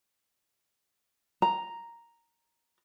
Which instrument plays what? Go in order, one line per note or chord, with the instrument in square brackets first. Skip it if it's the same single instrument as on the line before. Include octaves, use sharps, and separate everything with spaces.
[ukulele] A#5